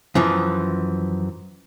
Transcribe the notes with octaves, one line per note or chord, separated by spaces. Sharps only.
F#2 E3 F3